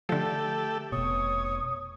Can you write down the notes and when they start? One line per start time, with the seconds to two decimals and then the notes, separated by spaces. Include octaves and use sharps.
0.09 D3 F3 A3 G4 A4
0.92 F1 B2 C#5 D#6